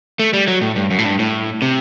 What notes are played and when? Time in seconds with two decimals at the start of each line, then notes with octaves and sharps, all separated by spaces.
0.19 A3
0.34 G3
0.48 F#3
0.62 A2
0.76 G2
0.91 F#2
0.99 A2
1.05 G2
1.19 A2
1.62 C3